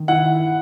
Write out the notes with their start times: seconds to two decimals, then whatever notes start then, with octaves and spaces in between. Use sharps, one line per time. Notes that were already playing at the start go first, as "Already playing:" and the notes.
Already playing: D#3
0.08 E4 F#5